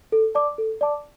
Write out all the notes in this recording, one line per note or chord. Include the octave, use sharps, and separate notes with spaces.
A4
D5 A5 D6
A4
D5 A5 D6